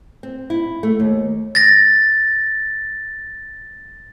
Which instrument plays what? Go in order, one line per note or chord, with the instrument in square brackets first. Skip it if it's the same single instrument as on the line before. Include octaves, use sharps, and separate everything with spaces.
[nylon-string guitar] C4
E4
A3
D#2
[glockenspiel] A6 A#6